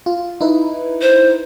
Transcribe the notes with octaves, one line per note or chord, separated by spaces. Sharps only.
F4
D#4 E4 B4
C5